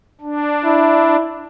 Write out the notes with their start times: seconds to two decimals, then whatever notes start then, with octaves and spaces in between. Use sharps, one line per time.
0.21 D4
0.65 E4